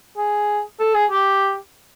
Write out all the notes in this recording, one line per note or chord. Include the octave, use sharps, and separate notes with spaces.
G#4
A4
G#4
G4